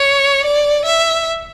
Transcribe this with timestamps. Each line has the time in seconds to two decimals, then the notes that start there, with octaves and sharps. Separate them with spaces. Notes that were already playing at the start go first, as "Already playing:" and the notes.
Already playing: C#5
0.45 D5
0.85 E5